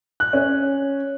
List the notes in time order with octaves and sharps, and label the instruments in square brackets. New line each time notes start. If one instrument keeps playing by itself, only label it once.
[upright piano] F#6
C#4